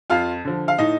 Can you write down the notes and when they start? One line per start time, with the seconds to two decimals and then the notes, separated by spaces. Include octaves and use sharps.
0.10 F2 F4 F5
0.45 D3 F3
0.68 F5
0.78 A2 D#4 D#5